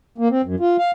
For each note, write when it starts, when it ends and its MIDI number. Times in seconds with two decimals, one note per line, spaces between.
0.18 0.28 58
0.31 0.42 60
0.44 0.55 42
0.60 0.77 65
0.79 0.91 77